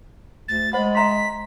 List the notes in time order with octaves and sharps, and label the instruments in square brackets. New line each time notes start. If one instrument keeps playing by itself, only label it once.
[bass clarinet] D2 [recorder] A6
[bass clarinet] G#3 [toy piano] C5 F#5 [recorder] B5
[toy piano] E5 A#5 C6 [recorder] B6